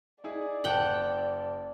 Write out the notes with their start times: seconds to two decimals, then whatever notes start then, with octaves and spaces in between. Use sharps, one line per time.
0.24 D#4 E4 G#4 D5
0.64 F#1 F#5 G5 A5